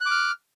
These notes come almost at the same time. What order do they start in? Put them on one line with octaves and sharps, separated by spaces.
F#6 D6 F6